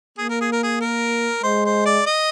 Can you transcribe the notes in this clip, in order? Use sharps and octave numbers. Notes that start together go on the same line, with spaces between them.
A#3 G#4
A#4
G#4
A#4
G#4
A#4
G#3 C5
C5
D5
D#5